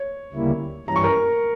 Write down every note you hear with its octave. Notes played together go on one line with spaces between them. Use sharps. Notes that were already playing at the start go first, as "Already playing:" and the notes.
Already playing: C#5
D2 C#3 G3 A#3 E4
G2 E3 G3 C#4 A#5
C#6
A#4 A#5